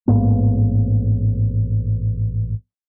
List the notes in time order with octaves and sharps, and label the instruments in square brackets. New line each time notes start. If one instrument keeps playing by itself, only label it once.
[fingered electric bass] A1 G#2 A#3 B3